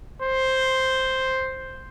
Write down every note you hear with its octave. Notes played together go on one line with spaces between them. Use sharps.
C5